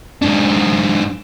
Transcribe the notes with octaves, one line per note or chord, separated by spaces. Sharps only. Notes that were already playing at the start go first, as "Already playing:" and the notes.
G#2 D4